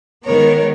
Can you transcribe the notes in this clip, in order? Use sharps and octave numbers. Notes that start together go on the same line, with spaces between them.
D#3 G#3 B3 A#4 C#5